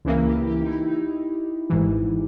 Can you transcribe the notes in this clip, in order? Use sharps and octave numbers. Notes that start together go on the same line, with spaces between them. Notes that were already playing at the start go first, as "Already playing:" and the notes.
C#2 C#3 E3 A#3 E4
G4
G4
D#4
E4
D#4
G#1 G#2 E3